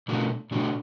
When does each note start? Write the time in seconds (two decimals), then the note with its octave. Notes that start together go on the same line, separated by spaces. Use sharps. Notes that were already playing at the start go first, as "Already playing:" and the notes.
0.08 B2 A3 D4 F#4
0.51 B2 A3 D4 F#4